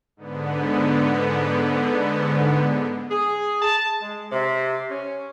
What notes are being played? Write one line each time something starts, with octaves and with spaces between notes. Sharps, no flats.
G#2 D3 B3
G#4
A5
G#3
C3
C#4